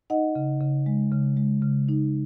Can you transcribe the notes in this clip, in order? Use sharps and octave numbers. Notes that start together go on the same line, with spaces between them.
D#4 D#5 F#5
C#3
C#3
G#3
C#3
G#3
C#3
D#4